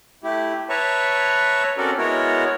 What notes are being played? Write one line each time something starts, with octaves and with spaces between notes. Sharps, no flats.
A3 E4 G4
B4 C#5 E5 A5 A#5 C#6
C4 C#4 F#4 A4 A#4 D5
G#3 B3 E4 F#4 A#4 C#5